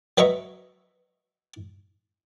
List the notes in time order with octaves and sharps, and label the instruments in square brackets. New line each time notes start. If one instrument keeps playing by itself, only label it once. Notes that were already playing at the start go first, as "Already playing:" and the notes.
[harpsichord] F#3 B4 D#5 E5 A#5 C#6